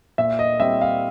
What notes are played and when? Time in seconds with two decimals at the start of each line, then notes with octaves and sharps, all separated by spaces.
0.18 A#2 E5
0.39 D#5
0.60 G3 C4 E5
0.81 F5